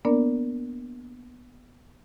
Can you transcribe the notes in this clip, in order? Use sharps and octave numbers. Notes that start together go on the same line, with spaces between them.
A#3 B3 D4 A#4 D5